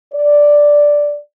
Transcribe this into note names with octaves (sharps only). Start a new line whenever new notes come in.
D5